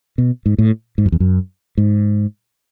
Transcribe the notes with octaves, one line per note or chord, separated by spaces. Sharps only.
B2
G#2
A2
G#2
F#2
E2
F#2
G#2